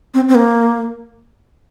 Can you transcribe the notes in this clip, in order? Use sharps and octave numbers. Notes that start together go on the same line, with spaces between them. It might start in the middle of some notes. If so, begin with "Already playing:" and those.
C4
C4
A#3